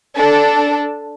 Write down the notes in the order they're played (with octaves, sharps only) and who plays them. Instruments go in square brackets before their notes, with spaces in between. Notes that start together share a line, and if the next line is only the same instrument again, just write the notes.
[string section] D4 A4